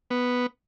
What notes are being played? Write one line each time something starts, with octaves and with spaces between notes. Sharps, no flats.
B3